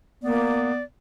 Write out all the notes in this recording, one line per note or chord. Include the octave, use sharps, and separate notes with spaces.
A#3 B3 D5